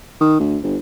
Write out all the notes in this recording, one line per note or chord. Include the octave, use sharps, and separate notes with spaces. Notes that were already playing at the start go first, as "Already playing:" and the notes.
D#3
D2
G1